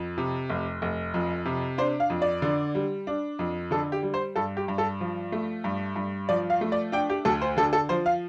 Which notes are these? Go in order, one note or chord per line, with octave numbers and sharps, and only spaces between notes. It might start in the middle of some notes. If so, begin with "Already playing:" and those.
Already playing: F2
C3
F1
F1
F2
C3
D4 C5
F5
F2
D5
D3
G3
D4
F2
D3 A4
G4
G3
C5
G2 A4
G4
G2
A4
F3
A3
G2
G2
F3 D5
F5
A3
D5
D4 G5
G4
D2 A4
C5
D3 A4
A4
F3 C5
F5